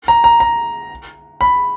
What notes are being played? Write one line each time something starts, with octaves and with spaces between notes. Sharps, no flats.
A#5
A#5
A#5
B5